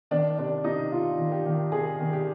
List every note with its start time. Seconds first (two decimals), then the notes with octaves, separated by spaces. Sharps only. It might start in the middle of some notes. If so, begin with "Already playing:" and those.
0.11 D#3 D4
0.38 C3 D4
0.64 C3 D#4
0.92 C3 F4
1.18 D#3
1.32 G4
1.46 D#3
1.72 C3 G#4
1.99 D#3
2.13 G4